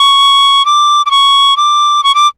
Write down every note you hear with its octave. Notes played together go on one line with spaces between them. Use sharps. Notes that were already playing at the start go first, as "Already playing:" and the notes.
Already playing: C#6
D6
D6
C#6
D6
C#6
D6